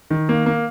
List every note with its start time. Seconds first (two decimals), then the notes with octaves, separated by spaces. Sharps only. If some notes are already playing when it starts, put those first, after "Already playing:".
0.11 D#3
0.29 A#3
0.46 A#3